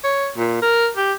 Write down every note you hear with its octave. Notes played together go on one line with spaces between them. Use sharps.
C#5
A#2
A#4
G4